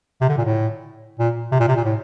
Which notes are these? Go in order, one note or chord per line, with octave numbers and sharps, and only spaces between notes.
C3
D3
A#2
A2
A#2
C3
A#2
C3
A#2
A2